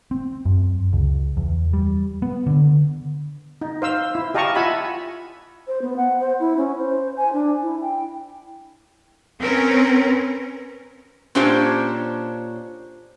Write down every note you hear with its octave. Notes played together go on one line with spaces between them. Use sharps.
C4
F#2
C#2
E2
G3
B3
D3
D#4
C5 F5 E6
E4
G4 D#5 F5 A5 A#5 C#6
F4 E5 F#5 G#5 A5 B5
C5
B3
F#5
C5
E4
C#4
C5
G#5
D4
E4
G5
C4 C#4 A#4 B4
A#2 C#4 D4 G4 C5 C#5